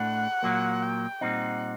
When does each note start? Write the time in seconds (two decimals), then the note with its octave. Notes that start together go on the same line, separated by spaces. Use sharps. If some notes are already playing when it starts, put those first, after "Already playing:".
Already playing: A2 A3 D4 F#5
0.43 A#2 F#3 A#3
0.82 G5
1.21 A#2 G3 C4 D#4 F#5